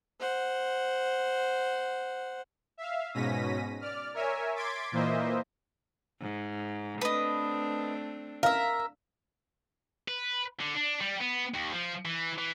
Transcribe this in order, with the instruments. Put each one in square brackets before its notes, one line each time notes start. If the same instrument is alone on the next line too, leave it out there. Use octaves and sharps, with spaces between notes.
[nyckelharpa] C5 F#5
[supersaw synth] E5 F5
G#2 B2 C#4 A#6 B6 D#7
D5 F6
A#4 C#5 E5 G#5
C6 D6 G#6 A6 B6 D7
A#2 E3 A#3 C5 D#5 E5
[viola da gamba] G#2
[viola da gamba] A3 C4 D4 [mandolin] B4 D#5
[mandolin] A#4 E5 [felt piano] F5
[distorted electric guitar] B4
D3
D4
G3
B3
D#2
F3
E3
E3